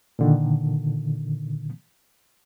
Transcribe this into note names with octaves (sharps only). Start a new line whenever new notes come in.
A#2 D3 D#3